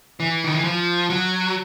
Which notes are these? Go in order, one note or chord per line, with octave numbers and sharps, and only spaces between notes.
E3
D#3
E3
F3
F#3